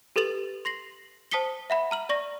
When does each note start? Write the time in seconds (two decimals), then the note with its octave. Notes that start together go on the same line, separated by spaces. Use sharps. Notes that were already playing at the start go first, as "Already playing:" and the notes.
0.16 G4 A4 B4 A6 F7 F#7
0.65 C6 A#6 C7 F#7
1.31 C5 A5 D#6 B6 C#7 G7
1.70 E5 F#5 B5
1.91 A#5 F6 F#7
2.09 D5 C#6 A#6